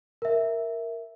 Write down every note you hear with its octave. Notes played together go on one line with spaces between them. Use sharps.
A#4 E5